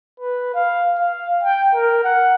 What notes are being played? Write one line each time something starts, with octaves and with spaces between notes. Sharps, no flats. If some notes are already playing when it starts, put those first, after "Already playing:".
B4
F5
F5
G5
A#4
F#5